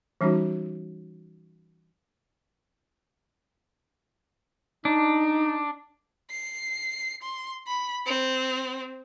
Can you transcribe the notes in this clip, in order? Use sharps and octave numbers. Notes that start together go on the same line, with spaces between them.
E3 G3 C#4 D#4 F#4
D4 D#4
C7
C6
B5
C4